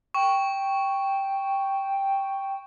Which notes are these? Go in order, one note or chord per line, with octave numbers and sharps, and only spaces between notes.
G5 C#6